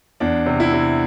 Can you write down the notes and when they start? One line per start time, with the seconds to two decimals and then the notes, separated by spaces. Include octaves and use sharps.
0.20 E2 D4
0.46 C3
0.60 E4
0.73 C3